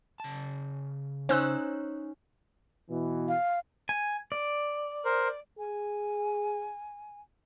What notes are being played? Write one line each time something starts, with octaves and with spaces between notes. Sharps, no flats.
C#3 A5
C#4 D#4 C5 E6 F#6
B2 E3
F5
G#5
D5
A#4 C5
G#4 G#5